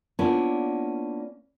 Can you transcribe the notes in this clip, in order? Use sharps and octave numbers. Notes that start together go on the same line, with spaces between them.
A#3 B3 C#4 D4 E4 F4